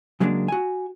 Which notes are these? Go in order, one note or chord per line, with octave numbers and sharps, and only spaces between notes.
C#3 F#3 G#3 A#3 C#4 D4
F#4 G#5